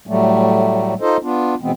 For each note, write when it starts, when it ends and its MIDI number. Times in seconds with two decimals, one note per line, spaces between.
0.07 0.94 45
0.07 0.94 54
0.07 0.94 55
0.07 0.94 57
1.01 1.17 63
1.01 1.17 65
1.01 1.17 69
1.01 1.17 72
1.01 1.17 75
1.23 1.55 59
1.23 1.55 62
1.23 1.55 65
1.61 1.71 47
1.61 1.71 52
1.61 1.71 56
1.61 1.71 59
1.61 1.71 60